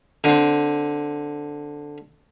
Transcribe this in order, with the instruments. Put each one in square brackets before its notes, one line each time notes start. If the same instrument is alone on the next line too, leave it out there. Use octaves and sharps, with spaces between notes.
[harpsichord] D3 C4